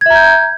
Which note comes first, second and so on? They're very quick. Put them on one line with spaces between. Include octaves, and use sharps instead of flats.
G#6 E5 A#5 G6